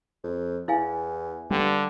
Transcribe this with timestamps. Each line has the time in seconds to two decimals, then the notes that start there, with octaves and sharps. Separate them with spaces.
0.24 F2
0.68 E2 E4 F5 G#5
1.51 G2 D3 G3